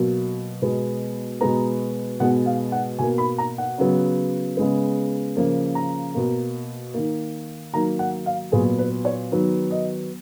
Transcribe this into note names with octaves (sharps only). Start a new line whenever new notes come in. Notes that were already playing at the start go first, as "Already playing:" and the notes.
Already playing: B2 F#3 A#3
B2 G#3 B3
B2 G#3 B3 A#5
B2 G#3 B3 F#5
F5
F#5
B2 A#3 G#5
B5
A#5
F#5
C#3 F#3 B3
C#3 G#3 B3
C#3 F3 A#3
A#5
B2 A#3
D#3 A#3
D#3 F#3 A#3 A#5
F#5
F5
A#2 F#3 B3 G#4
B4
C#5
D#3 F#3 B3
D#5